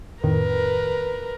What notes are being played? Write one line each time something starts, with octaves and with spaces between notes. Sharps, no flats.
F2 A2 D#3 A#4 B4